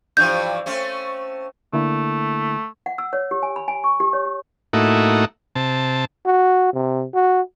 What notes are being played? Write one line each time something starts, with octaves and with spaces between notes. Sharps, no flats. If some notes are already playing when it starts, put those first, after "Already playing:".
G2 E3 F3 G6
A3 C4 C#4
D3 A3 A#3 E4
F#5
E6
C#5
G4
G#5
B5
G#5
C#6
G4
C#5
G4
A2 A3 A#3 D#4 E4 F#4
C3 A5
F#4
C3
F#4